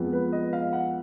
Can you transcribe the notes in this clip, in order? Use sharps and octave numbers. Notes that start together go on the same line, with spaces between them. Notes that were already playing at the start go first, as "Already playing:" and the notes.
Already playing: F2 F3 G#3 B3
B4
D#5
F5
F#5